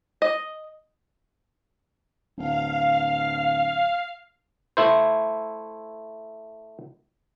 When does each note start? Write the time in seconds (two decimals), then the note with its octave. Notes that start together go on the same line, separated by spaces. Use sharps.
0.22 D#5
2.37 D1 F5
4.77 A3 E4 C5